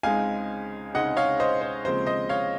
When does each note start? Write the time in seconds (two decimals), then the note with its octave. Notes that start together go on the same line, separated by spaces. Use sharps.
0.03 C#2 C#3 G#3 C4 D#4 F5 G#5
0.94 C#2 C#3 G#3 C4 D#4 D#5 F#5
1.17 C#5 F5
1.40 C5 D#5
1.62 C5
1.85 D#2 C#3 F3 G#3 C4 C5
2.06 C5 D#5
2.29 C#5 F5